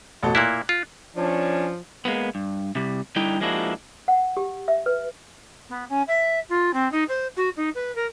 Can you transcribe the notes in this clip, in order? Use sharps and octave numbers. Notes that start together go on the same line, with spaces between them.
A1 B2 A4
A#2 A#3 E4 F#6
F4
F3 C#4 D4 C#5
G#3 A#3 B3
G2
C3 G3
D3 G3 D#4 E4 G5
F3 G#3 A#3 D4 E4 F#4
F#5
G4
E5
B4
B3
C#4
E5
F4
C4
D#4
C5
F#4
D#4
B4
A#4